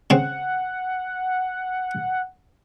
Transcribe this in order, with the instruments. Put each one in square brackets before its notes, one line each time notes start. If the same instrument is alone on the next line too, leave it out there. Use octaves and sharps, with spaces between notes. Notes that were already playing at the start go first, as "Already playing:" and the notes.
[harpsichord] C#3 C4 [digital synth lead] F#5